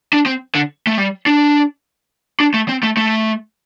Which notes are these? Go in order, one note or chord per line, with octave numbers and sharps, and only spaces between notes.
D4
C4
D3
A3
G3
D4
D4
A3
C4
A3
A3